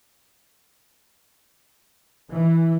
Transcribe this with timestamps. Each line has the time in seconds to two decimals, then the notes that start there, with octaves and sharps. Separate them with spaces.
2.31 E3